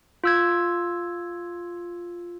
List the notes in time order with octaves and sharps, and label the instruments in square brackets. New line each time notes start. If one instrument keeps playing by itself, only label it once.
[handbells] F4 E6 G#6